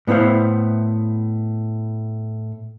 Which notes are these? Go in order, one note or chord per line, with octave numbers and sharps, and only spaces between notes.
A2 B3 E4 C5 F5